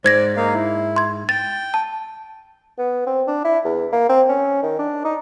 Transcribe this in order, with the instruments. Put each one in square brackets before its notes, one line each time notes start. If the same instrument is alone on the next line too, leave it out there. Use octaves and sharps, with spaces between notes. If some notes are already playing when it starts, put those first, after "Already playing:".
[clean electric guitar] G#2 [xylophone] C5 G#6 A#6 [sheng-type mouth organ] D5
[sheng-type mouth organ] A#3 D#4 F5
E4
[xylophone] C6 G#6
[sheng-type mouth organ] G5 [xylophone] A6
[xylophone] A5
[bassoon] B3
C4
D4
E4
E2
A#3
C4
C#4
D#3
D4
D#4